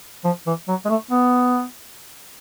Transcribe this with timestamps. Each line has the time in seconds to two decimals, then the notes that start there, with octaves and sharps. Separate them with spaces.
0.24 F3
0.46 E3
0.68 F#3
0.85 G#3
0.89 A3
1.11 B3